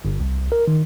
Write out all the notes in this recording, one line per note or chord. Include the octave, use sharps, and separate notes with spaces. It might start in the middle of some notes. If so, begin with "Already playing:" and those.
G1
C2
A#4
D#3